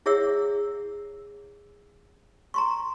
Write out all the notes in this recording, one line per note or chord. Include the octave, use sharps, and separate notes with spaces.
E4 G#4 C#5 E5 F#5 E6
A#5 C6 C#6